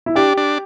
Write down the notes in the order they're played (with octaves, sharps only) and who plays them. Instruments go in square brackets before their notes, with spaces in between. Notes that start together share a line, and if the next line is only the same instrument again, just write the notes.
[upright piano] E4
[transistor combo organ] D4 [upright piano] G4
[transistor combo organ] D4